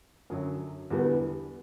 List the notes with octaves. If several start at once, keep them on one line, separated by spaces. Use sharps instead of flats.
F#2 D3 F#3
E2 D3 G3 B3